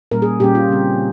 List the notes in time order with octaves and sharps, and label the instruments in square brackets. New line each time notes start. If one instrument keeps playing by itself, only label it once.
[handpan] A#2 G3 A#3 C#4 A#4
G#4
A#2 G3 A#3 C#4 G4
F4
C#3 G3 C4